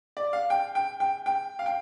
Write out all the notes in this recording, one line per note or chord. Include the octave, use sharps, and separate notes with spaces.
D5
F5
G5
G5
G5
G5
F5
G5